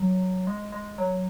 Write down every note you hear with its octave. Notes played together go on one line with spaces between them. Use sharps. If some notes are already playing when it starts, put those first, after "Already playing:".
Already playing: F#3
G#3
G#3
F#3